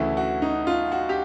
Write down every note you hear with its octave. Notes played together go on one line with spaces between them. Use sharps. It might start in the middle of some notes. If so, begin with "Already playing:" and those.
Already playing: D2 C#3 E3 A3 E4
F#4
D#4
F4
F#4
G4